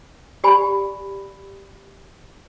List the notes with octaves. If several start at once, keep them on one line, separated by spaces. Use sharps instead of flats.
G4 D5 G#5 B5